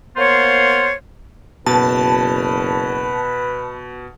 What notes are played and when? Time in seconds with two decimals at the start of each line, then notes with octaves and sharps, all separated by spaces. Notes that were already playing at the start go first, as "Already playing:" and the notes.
0.16 A#3 B3 F4 C5 C#5
1.66 F#1 B2 B4 A5 B5